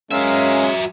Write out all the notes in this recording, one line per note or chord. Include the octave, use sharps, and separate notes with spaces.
F#3 G#3 C#4 A#4 E5 F5